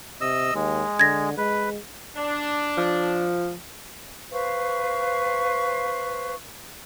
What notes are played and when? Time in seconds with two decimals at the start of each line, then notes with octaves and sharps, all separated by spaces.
0.21 C3 D#5 E6
0.54 D#2 G#3
1.00 D3 G#6 A#6
1.38 G#3 B4
2.17 D4
2.77 F3
4.32 B4 C5 F5 C#6